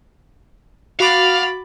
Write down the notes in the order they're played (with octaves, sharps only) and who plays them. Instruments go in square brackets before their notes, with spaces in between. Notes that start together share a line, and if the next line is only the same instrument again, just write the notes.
[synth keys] F#4 D6 [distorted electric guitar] F5 [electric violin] B5 A6